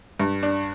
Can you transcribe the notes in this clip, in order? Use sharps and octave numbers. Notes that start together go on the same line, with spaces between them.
G2
D4